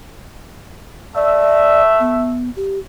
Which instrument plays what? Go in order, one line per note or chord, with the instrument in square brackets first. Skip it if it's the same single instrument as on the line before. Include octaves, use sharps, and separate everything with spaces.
[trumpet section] A3 E5 [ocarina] D5
[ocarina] B3
G4